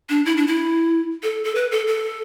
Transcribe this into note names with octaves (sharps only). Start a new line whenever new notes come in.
D4
E4
D4
E4
A4
A4
B4
A4
A4